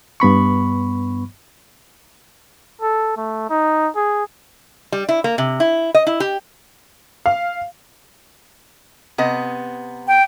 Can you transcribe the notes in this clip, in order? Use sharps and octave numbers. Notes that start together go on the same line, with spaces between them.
G2 B3 B5 C#6
A4
A3
D#4
G#4
G3
E4
A#3
C3
E4
D#5
E4
G4
F5
C3 B3 D#5
G5